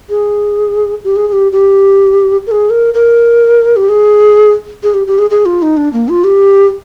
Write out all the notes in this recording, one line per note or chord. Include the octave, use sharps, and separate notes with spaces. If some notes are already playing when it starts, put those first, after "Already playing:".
G#4
G4
G#4
G#4
G4
G4
A#4
G#4
A#4
A#4
G4
G#4
G#4
G4
G4
G#4
G#4
F4
D#4
D4
A#3
F4
G4